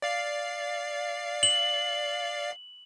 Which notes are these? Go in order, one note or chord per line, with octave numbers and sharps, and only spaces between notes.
D5 F5 C7
F#7